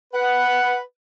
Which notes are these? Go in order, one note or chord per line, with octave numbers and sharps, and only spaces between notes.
B4 F#5